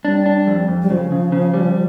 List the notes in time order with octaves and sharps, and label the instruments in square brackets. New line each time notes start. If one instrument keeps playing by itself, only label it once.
[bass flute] G3 [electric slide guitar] D4
[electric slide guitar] D4
F2
F2
[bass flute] G3
[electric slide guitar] C#3 [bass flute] F3
[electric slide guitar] C#3
C#3
G3